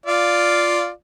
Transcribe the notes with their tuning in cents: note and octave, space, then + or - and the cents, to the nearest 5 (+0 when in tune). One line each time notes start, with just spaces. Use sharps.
F4 +0 D5 +0 F5 +0